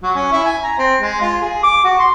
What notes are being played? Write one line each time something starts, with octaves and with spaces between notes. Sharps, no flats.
F#3
C#4
E4
G#5
A#5
C4
G#3
F4
G#4
D6
F#4
C6